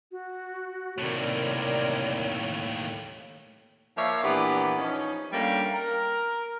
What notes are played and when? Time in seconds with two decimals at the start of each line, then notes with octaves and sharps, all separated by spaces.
0.12 F#4
0.98 D#2 A2 C3 A#4 C#5 D5
3.97 F3 A#3 C#5 D5 E5 F5
4.23 A#2 E3 B3 D4 G4
4.78 F3 C#4 D#4
5.33 G3 A3 A#3 C#4 D4 F4
5.73 A#4